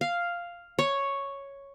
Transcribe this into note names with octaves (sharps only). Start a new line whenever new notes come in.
F5
C#5